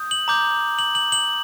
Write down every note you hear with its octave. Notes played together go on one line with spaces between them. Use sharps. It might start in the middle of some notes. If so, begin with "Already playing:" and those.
Already playing: D#6 G6
F#7
A#5 D6 G6
F#7
F#7
F#7